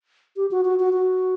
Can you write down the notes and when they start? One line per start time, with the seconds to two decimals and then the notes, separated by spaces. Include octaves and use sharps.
0.37 G4
0.51 F#4
0.65 F#4
0.79 F#4
0.93 F#4